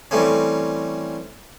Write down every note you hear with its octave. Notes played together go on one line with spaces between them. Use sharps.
E3 G3 A3 C4 C#4